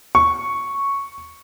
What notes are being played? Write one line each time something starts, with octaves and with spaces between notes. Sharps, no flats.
C#6